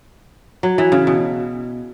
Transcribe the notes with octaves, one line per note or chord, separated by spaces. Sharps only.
F#3
E3
C#3
B2